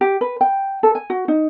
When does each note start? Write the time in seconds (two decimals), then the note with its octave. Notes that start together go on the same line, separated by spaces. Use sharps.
0.01 G4
0.21 B4
0.41 G5
0.83 A4
0.95 G#5
1.10 F#4
1.28 D#4